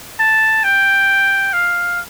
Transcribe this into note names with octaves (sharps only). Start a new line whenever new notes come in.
A5
G5
F5